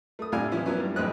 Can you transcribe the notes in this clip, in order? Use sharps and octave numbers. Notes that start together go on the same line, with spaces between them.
A3 D#6
A2 C3 D4 F5 G#5
E3 F3 C#4 E4
F3 F#3 A#3 B3 C#4
G2
A1 A2 F3 C4 D#5 F#6